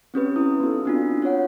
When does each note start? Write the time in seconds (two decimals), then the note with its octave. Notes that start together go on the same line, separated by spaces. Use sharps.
0.14 C4 C#4 G4 B4
0.36 E4 D#6
0.60 B3 D#4 F#4 A4
0.85 C4 D4 F4
1.22 F4 F#4 C#5 F#5